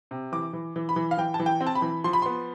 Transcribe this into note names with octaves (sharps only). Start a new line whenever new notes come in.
C3
E3 D6
E3
E3
B5
E3
F5
E3 G5
A5
E3
G5
C4
A5
B5
E3
F3 C6
B5
B3 C6